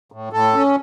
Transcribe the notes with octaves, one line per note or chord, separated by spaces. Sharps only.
A2
A2 A4
C#4